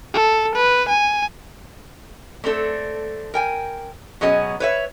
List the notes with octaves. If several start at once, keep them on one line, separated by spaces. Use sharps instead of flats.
A4
B4
G#5
A3 C4 D4 A4
A#4 G5 G#5
B2 F#3 C#4 G#4 D#5
B4 C#5 E5